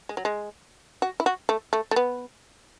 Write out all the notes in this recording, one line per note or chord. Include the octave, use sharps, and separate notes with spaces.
G#3
F#3
G#3
F#4
E4
F#4
A3
A3
A3
B3